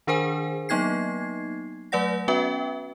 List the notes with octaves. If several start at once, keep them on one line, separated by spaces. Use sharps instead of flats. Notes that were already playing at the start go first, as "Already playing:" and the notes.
D#3 D4 G#4 A#4 C5 G#5
F#3 A#3 B3 D#4 G#6 C7
F#3 A3 B4 D5 F#5 A#6
B3 C#4 F#4 B4 E5 G5